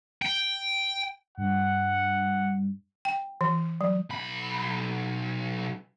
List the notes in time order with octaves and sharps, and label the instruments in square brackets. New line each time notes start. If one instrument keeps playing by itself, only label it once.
[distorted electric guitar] G5
[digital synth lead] G2 [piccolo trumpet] F#5
[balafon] G5
E3
F#3
[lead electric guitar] B1 B5